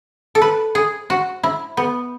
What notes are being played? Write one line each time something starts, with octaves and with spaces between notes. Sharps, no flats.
A4
B4
G#4
F#4
E4
B3